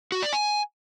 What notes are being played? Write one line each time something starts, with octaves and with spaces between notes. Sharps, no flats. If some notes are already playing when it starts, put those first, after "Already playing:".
F#4
D5
G#5